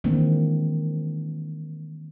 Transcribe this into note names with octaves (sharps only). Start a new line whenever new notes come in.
D#3 E3 G#3 A#3 C4 D4